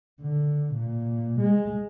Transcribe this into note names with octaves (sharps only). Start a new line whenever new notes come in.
D3
A#2
G#3